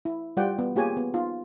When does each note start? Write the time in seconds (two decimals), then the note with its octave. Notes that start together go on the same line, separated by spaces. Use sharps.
0.05 E4
0.37 G3 F4 G4 D5 F#5 G5
0.59 B3
0.76 A#3 F4 G4 G#4 C#5 G#5
0.97 B3
1.14 B3 D#4 F4